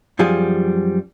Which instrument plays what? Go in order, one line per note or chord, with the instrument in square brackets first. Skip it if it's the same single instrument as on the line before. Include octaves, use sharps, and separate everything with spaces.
[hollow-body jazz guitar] F#2 F3 G3 G#4